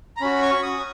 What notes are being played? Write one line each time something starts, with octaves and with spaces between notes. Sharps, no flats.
A#5
C#4 F#4 B5
C#6
D#6